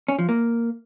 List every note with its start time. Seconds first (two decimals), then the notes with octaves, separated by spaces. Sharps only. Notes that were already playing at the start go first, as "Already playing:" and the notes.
0.08 C#4
0.19 F3
0.29 A#3